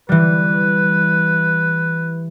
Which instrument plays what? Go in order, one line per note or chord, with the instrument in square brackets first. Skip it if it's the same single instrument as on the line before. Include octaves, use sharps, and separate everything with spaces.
[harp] E3 G3 [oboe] B4